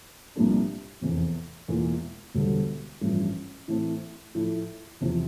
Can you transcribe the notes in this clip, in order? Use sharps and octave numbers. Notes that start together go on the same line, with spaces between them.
C2 A#2 F3 A#3 D4
F1 E2 E3
E1 E2 E3 A#3 F4
E1 D2 D3 G3
A1 G2 F3
A2 E3 A3 C4
A2 F3 A3 E4
E2 C3 F3 C4